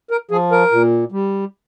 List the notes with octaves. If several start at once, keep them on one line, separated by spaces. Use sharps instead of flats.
A#4
F3 G#4
A#4
A#2
G3